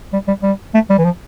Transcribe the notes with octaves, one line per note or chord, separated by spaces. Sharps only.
G3
G3
G3
A3
G3
E3
F3